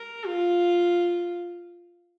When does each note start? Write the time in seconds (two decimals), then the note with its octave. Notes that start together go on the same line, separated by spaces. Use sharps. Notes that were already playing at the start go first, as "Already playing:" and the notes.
Already playing: A#4
0.26 F4